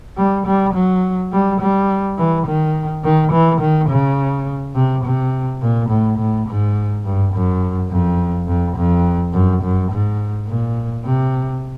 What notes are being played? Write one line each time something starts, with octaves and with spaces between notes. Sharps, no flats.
G3
G3
F#3
G3
G3
E3
D#3
D#3
E3
D#3
C#3
C3
C3
A#2
A2
A2
G#2
G2
F#2
F2
F2
F2
F#2
F#2
G#2
A#2
C3